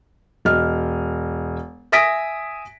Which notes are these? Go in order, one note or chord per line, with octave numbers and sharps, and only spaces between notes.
E1 D#5 F6
E5 G#5 D#6 A#6 B6 D7